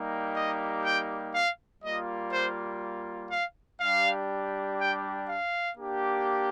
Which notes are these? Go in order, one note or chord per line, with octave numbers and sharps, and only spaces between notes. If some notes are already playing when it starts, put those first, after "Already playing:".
Already playing: G3 A#3 D#4 G4
D#5
G5
F5
G3 A#3 F4 D#5
C5
F5
G3 D4 G4 F5
G5
F5
A#3 D4 G4